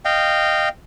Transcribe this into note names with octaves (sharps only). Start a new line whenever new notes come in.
D#5 F5 G5